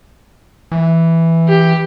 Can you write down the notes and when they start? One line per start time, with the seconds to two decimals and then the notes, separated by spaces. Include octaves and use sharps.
0.72 E3
1.48 G4